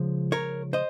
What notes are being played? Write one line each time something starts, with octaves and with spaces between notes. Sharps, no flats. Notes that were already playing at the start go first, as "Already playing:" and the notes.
Already playing: C#3 F3 G#3
A#4 C#5
C5 D#5